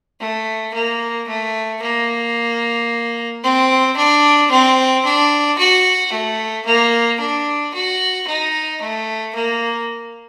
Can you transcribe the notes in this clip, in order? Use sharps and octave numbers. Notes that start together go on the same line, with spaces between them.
A3
A#3
A3
A#3
C4
D4
C4
D4
F#4
A3
A#3
D4
F#4
D#4
A3
A#3